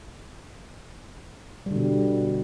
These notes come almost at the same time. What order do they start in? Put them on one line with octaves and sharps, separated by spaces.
G3 D3 B2